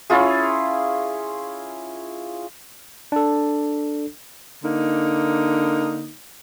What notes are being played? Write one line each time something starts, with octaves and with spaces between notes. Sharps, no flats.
C#4 E4 F4 G#4
D4 A4
D3 A#3 D#4